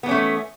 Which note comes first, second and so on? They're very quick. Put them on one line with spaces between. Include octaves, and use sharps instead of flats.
B3 E3 C#4 A3